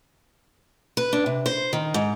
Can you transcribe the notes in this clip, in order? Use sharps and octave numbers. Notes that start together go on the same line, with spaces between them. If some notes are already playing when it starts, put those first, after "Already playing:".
B4
D4
C3
C5
D#3
G#2